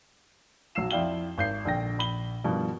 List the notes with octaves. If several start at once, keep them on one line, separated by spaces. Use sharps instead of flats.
B1 F#3 F#4 E6 C7 E7
F2 E4 D5 F5 G5 G7
G#1 G6 C7
A#1 D3 G5 A#6
A#1 B5 G7
G2 B2 D#3 F3